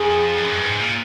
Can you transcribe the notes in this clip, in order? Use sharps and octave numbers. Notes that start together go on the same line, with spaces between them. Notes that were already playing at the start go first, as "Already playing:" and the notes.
Already playing: F2 G#4
F#2
G2
G#2
A#2